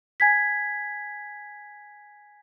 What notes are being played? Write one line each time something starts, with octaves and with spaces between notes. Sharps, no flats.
G#5 G#6 B6